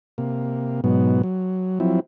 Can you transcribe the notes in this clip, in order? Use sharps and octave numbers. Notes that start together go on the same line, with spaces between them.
C3 A#3
G#2 B2 F#3 B3
F#3
F3 F#3 C4 E4